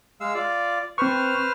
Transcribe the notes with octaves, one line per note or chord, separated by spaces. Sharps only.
G#3 F5 E6
F4 D5
C4 B4 C5 C#6 F6